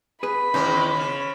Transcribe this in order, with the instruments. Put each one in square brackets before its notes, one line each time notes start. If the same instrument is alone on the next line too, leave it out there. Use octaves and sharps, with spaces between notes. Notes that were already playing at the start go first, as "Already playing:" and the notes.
[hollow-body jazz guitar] G#4 B4 [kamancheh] B5
[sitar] E2 G#3 [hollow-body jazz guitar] D#3 C#4 D#4
[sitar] C#3